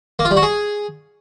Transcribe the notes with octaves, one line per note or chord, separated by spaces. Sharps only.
A#3
F4
G3
F#4
G#4